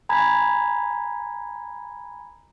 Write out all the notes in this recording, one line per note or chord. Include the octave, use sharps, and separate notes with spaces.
G#5 A#5 B5 G#6